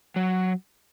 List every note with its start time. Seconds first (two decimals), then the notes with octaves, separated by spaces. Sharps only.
0.16 F#3